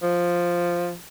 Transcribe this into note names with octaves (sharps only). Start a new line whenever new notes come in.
F3